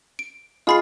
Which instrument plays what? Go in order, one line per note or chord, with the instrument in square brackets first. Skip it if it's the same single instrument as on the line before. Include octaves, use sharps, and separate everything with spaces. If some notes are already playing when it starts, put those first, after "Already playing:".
[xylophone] D7
[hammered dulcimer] F4 G#4 [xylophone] D#5 B5 C7